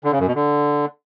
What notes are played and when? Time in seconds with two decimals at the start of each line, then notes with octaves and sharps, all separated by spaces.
0.04 D3
0.12 C#3
0.20 F#2
0.27 B2
0.35 D3